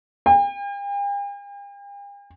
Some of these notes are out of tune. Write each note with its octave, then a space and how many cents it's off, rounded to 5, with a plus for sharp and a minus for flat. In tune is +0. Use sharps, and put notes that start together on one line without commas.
G5 +45